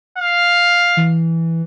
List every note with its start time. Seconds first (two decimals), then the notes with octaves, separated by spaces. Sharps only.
0.18 F5
0.97 E3